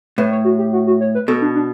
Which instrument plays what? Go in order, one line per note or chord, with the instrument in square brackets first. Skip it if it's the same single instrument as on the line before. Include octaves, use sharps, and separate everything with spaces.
[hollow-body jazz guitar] A2 [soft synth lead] B4
[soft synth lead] C#5
F#4
G4
F#4
F#4
C#5
B4
[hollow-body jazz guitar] B2 [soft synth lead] A4
[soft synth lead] D4
D4